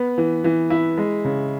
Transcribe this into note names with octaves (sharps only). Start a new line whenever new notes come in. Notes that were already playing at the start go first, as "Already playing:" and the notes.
Already playing: B3
E3
E3
E4
G#3
C#3